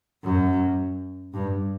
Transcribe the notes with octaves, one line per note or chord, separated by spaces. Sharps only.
F#2
G2